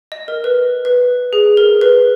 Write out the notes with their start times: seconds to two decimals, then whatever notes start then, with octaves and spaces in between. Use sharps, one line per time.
0.12 D#5
0.28 A#4
0.44 B4
0.85 B4
1.33 G#4
1.57 A#4
1.81 B4